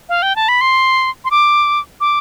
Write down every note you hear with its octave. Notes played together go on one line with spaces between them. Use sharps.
F5
G5
A5
B5
C6
C6
D6
D6